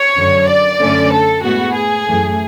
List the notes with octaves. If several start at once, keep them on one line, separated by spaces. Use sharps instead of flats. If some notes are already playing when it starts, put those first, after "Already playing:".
Already playing: C#5
F#2 D3 F#3
D5
F#2 D3 A3 C#4
A4
A2 G#3 B3 F#4
G#4
F#2 E3 A3